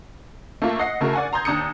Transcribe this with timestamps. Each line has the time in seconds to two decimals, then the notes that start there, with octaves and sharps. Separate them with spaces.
0.62 A3 A#3 F4
0.79 D#5 F#5 A#6 C7
1.01 C#3 A3 F#4 A#4
1.13 D5 F#5 G#5
1.33 A#5 C6 D#6 G6 G#6
1.45 D#2 D4 A#5 D#6 G6 C#7